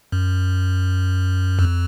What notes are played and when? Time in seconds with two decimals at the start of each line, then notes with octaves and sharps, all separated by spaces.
0.12 F#2
1.59 F2